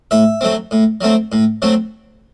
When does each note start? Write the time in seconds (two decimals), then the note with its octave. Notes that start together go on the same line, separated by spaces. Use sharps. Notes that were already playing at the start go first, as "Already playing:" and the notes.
0.11 A2 E5
0.41 F#3 A3 C4
0.71 A2
1.01 F#3 A3 C4
1.32 A2
1.62 F#3 A3 C4